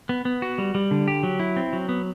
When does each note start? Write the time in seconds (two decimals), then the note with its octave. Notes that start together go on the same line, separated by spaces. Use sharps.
0.09 B3
0.25 B3
0.42 F#4
0.58 G3
0.75 G3
0.91 D3
1.08 G4
1.23 F#3
1.40 E4
1.56 C4
1.73 F#3
1.89 B3